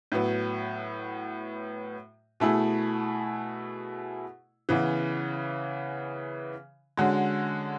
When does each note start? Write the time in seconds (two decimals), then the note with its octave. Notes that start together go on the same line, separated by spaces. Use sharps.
0.12 A2 F#3 B3
2.40 B2 A3 E4 G#4
4.69 C#3 E3 B3
6.97 D3 G#3 C#4 F#4